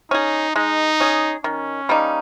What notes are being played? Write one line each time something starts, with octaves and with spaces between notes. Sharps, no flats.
C#4 D#4 G#4
G#3 D#4
C#4 G#4
D#3 C#4
G3 A#3 D#4